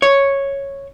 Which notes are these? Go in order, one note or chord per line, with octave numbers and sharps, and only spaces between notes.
C#5